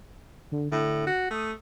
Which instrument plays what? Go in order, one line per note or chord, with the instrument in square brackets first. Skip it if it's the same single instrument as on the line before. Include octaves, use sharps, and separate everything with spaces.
[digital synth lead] D3
[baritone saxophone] A2 [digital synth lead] D3
[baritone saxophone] F#4
[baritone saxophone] A3 [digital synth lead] D#6